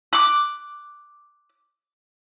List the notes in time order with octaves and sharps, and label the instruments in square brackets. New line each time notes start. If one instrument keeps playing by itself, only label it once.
[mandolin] D6 F#6